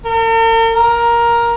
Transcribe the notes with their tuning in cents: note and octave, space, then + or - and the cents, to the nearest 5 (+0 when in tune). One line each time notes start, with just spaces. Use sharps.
A#4 -45
A#4 +10